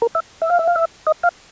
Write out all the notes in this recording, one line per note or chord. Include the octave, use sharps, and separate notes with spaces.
A#4
E5
E5
F5
E5
F5
E5
D#5
F5